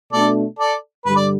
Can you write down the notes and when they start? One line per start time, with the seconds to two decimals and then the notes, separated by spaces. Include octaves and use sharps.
0.12 B2 A3 D4 A4 D5
0.59 A4 D5
1.06 G2 D3 G3 B4
1.16 D5